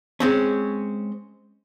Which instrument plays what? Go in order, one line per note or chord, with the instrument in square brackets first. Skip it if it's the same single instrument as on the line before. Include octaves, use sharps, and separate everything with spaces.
[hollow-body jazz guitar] G#3 C4 C#4